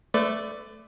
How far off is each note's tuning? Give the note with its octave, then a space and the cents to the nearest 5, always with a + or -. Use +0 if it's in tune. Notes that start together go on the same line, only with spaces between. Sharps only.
A3 +0 B4 +40 D5 +0